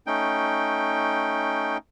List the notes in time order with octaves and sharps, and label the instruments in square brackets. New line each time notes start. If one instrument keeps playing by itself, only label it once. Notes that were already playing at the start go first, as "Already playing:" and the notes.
[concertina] A3 C#4 D#4 G5